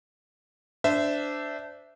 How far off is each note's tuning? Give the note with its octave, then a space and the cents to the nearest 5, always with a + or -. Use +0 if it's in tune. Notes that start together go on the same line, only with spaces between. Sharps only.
D4 -5 C5 -25 E5 +0